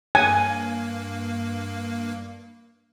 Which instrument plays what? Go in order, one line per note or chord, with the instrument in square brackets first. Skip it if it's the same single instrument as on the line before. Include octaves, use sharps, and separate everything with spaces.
[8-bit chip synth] G2 A#3 [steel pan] G#5